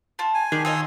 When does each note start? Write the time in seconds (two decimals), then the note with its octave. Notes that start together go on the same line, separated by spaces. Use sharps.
0.19 F4 A5
0.34 G#5
0.52 D#3 D4 G4 G#4
0.65 F4 C#5 D#5 G#5 D#6 E6